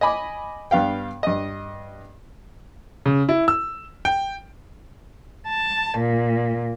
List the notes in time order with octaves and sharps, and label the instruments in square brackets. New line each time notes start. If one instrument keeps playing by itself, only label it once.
[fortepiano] D#5 G#5 B5 D6
G2 B3 F5 G5
G2 D#5
[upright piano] C#3
E4
E6
G5
[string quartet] A5
A#2